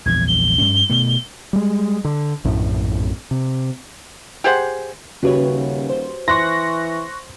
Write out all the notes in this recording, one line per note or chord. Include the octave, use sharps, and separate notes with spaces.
A#1 E2 G#6
G7
G2 C#4
B2 A3
G3 G#3
D3
A#1 F#2 A2
C3
G4 G#4 C5 F#5
D#1 C#3 F#4 G4 B4 C#5
C5
E3 C6 C#6 F#6 A#6